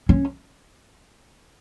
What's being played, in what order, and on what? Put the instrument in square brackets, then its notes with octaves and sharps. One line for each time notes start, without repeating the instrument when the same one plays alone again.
[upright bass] C#4